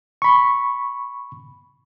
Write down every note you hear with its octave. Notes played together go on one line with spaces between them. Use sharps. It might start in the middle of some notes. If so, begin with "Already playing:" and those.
B5 C#6